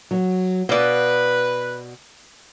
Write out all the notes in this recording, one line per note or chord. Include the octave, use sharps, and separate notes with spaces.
F#3
B2 B4 D5 F5